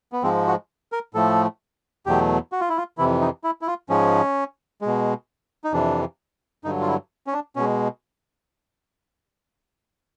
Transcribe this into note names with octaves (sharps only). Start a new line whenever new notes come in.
B3
G#2 F3 G#3 C4
F#4
A#4
A2 F3 A3 A4
E2 B2 F#3 A3 G4
F#4
F4
E4
F4
F2 C3 E3 E4
D#4
E4
E4
F4
G#2 F3 G#3 C#4
B2 G#3
D#4
F2 C3 E3 D4
G2 D3 F#3 D#4
F4
E4
C#4
D4
B2 G#3 C#4